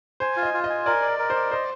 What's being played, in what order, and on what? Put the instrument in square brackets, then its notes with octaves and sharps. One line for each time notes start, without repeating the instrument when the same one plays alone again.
[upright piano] C5 [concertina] G#5
[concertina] F4
[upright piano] D#5
[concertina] F4
[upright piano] D#5
[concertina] G#5
[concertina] A#4 [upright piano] D5
[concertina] D5
A#4
[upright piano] C5
[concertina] D5
[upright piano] C5 [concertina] D#5